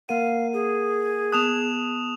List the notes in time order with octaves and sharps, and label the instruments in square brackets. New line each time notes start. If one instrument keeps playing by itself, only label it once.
[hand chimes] A#3 A#4 F#5 [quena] F5 [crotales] D#7
[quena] G#4
[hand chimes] B3 A5 F#6 [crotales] D#6 E7 F7